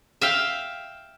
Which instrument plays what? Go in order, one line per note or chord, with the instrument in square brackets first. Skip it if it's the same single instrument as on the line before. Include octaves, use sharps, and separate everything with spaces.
[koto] E5 F5 G5